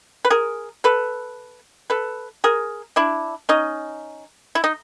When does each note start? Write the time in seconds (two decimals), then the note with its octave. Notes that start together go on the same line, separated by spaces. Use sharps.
0.25 B4
0.30 G#4 A#4
0.84 A4 B4
1.90 A4 B4
2.44 G#4 A#4
2.96 D4 E4
3.49 C#4 D#4
4.55 E4
4.64 D#4